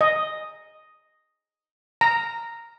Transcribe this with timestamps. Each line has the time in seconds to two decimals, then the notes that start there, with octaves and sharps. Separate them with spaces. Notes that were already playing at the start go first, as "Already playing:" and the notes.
0.01 D#5
2.01 A#5